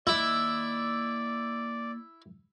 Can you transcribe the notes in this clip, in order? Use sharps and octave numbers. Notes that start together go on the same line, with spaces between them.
A#3 E4 D5 D#5